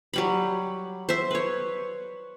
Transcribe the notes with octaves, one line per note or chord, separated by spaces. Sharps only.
F#3 G3 B5
C5 E5
B4 C#5